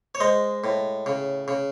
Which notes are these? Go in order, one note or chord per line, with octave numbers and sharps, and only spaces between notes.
C#5
G#3 C5 D#5
A2
C#3
C#3